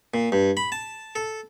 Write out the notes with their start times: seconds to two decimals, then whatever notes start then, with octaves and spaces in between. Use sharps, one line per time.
0.14 A#2
0.32 G2
0.57 B5
0.72 A5
1.15 A4